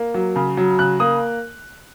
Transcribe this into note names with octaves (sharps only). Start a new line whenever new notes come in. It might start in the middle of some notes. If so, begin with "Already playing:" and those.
Already playing: A#3
F#3
C#3
F#3
C#3 F#6
A#3 D#6